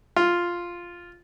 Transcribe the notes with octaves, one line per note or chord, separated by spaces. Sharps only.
F4